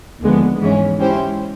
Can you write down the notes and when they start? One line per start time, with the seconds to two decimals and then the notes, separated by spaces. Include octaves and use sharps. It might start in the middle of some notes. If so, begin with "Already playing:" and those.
0.21 D#2 D3 F3 G#3 B3
0.60 G#2 E3 G#3 C#4
0.99 G#3 C#4 E4 G4 C5